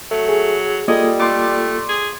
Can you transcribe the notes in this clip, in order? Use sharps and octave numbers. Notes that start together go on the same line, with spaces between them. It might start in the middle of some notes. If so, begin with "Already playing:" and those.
F#3 A3
G#4
G3 G#3 A#3 F4 A4 D#5
A3 C6 D6
G#4